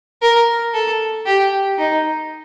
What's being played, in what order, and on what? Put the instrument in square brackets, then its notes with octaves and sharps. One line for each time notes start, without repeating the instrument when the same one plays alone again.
[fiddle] A#4
A4
G4
D#4